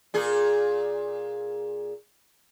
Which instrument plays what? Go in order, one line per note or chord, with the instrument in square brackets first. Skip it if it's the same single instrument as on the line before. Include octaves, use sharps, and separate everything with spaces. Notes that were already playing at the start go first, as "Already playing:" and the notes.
[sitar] A#2 G#4